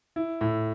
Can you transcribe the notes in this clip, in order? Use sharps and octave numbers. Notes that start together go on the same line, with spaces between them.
E4
A2